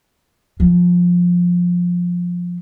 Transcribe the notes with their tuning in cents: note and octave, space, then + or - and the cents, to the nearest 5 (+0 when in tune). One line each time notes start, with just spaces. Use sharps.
F3 +15